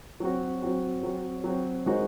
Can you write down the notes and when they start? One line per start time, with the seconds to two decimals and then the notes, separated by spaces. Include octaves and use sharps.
0.20 F#3 C4 F#4
0.62 F#3 C4 F#4
1.03 F#3 C4 F#4
1.44 F#3 C4 F#4
1.86 D#3 G#3 D#4 F#4 C5